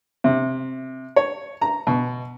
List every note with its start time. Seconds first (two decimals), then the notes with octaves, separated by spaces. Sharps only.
0.24 C3
1.16 C#5
1.62 A#5
1.87 B2